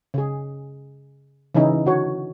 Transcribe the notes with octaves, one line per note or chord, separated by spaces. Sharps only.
C#3 G#4
C#3 E3 C#4 D#4 E4
D3 F#4 C#5